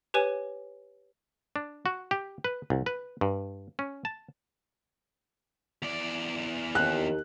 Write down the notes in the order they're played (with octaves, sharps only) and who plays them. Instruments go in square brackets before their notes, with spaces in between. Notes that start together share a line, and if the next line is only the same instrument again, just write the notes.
[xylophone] G4 B4 C#5 G#5
[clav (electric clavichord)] D4
F#4
G4
B4
C2
B4
G2
C#4
A5
[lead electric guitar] E2 D5
[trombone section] D#2 [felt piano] F#6